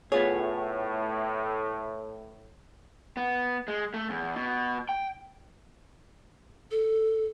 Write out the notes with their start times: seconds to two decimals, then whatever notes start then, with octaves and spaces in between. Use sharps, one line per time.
0.12 A2 B3 F4 G#4 C#5
3.17 B3
3.68 G#3
3.94 A3
4.10 E2
4.36 B2
4.89 G5
6.71 A4